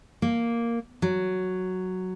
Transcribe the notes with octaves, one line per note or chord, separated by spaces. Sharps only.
A#3
F#3